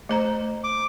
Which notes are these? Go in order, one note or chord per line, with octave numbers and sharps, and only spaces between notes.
A3 C5 A#5
D6